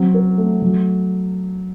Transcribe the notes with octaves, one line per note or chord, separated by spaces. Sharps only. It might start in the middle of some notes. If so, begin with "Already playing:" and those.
Already playing: F#3 C4
A#4
A3
F#3